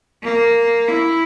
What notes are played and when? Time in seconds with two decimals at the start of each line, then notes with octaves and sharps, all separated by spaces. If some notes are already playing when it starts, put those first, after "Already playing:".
0.23 A#3
0.88 E4